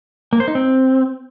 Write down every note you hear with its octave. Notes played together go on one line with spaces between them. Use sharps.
A#3
C5
D#4
C4